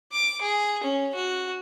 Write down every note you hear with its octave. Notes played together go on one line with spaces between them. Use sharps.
D6
G#4
C#4
F#4